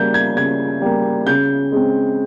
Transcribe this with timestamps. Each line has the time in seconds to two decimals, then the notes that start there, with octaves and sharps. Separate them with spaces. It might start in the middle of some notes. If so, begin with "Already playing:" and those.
Already playing: C#3 G3 A#3 G6
0.14 G#6
0.36 C#3 G#6
0.82 G3 A#3
1.27 C#3 G6
1.72 G#3 C4